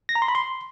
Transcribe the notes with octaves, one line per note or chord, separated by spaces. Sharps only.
A#6
A#5
C6
B5
C6